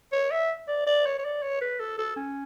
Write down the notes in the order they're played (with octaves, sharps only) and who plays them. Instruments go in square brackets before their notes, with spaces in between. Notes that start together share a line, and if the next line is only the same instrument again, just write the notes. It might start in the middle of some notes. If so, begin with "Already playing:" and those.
[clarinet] C#5
E5
D5
D5
C#5
C#5
D5
C#5
B4
A4
A4
C#4